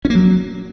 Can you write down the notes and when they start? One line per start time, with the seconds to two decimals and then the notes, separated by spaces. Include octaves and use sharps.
0.05 C#4
0.10 A#3
0.15 F#3